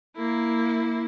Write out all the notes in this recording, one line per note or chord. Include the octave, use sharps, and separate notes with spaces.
A#3 E4